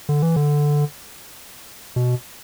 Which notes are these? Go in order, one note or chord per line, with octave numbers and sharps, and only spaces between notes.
D3
E3
D3
B2